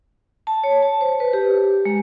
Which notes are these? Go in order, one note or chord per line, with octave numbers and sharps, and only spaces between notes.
A5
C#5
A5
C5
B4
G4
G#3